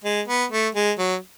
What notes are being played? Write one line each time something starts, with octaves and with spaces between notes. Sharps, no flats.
G#3
B3
A3
G#3
F#3